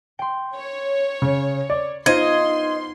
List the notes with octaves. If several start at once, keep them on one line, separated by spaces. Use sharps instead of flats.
G5 C6
C#5
C#3
D5
B3 D#4 F4 C5 D#5 F5 C6 G#6